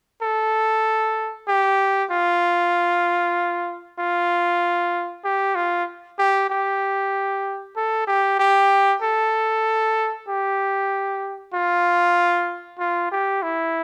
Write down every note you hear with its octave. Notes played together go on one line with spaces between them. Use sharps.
A4
G4
F4
F4
G4
F4
G4
G4
A4
G4
G4
A4
G4
F4
F4
G4
E4